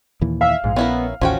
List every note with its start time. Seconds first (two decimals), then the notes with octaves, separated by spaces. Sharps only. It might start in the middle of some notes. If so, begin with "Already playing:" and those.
0.21 D#2 A#2 E3
0.41 E5 F5
0.64 A#1 G#2
0.76 B3 C#4 E4 A#4
1.21 A1 D#2 F3 C#4 F#4 G5